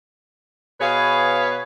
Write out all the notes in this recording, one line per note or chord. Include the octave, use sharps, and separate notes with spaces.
B2 G#4 B4 C#5 F5